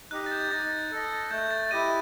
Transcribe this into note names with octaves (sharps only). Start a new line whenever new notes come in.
D#4 G4 D#5 F#6
A6
G6
D#4 A6
A4 D#5
A3 G6
A6
E4 G4 D#5 D#7